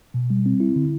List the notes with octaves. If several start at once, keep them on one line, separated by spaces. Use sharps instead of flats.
B2
G3
C4
E4
D3